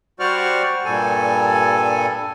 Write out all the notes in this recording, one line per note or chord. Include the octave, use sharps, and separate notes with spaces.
G3 F#4 C5 D5 C#6 F6
G2 A#2 G3 A4 G#5